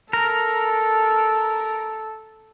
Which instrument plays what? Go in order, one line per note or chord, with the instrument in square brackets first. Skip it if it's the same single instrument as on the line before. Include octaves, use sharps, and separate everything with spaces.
[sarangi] A4 [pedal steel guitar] A#4